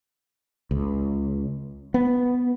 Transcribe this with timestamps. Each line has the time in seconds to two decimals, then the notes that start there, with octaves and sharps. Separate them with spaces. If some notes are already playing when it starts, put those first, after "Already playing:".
0.71 C#2
1.94 B3